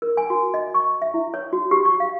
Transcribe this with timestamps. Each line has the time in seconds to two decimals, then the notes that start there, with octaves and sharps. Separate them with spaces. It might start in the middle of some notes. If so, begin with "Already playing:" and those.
0.02 A#4
0.17 G#5
0.30 F#4
0.54 D#5
0.74 C#6
1.02 E5
1.14 E4
1.34 C#5
1.53 F#4
1.71 G4
1.85 C#6
2.00 F5